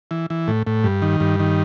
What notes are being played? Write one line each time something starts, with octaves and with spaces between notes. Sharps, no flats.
E3
E3
A2
A2
G2
D#3
G2
D#3